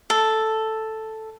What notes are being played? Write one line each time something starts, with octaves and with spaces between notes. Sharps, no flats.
A4